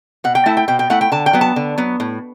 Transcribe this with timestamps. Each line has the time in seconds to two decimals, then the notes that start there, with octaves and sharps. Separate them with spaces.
0.24 B2 F#5
0.35 G5
0.46 A3 E4 A5
0.57 G5
0.68 B2 G5
0.79 G5
0.90 A3 E4 F#5
1.01 G5
1.12 D3 A5
1.26 G5
1.33 F#3 B3
1.41 A5
1.56 D3
1.78 F#3 B3
2.00 A2